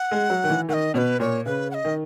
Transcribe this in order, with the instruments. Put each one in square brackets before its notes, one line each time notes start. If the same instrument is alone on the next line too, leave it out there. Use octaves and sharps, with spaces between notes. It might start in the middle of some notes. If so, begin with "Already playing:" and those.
Already playing: [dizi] F#5
[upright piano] G#3
F#3
D#3
E3
[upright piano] D#3 [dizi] F#5
[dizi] D#5
[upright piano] B2 [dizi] C#5
[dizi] B4
[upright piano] A#2 [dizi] C#5
[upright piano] C#3 [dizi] B4
[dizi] F#5
D#5
[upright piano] D#3